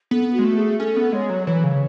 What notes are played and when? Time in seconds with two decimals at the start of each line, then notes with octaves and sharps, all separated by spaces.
0.11 B3 A4
0.33 F#4
0.39 G#3
0.44 A3
0.56 G#4
0.78 C#4 A4
0.96 B3
1.13 G#3 C#5
1.30 F#3
1.47 E3 C#5
1.64 C#3